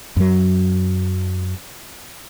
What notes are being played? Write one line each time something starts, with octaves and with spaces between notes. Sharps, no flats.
F#2 F#3